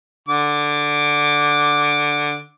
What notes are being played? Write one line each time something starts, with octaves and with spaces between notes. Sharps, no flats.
D3 D6